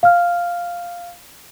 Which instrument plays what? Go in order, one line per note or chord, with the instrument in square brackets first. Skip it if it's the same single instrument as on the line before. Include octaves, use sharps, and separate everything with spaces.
[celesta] F5 F6